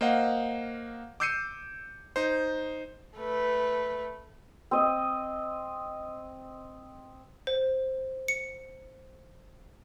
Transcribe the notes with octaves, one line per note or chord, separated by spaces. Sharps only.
A#3 C5 D#5 F5 F#5
D6 E6 G6 C7 C#7 D#7
D#4 C5
A3 B4
C4 D#5
C5
C#7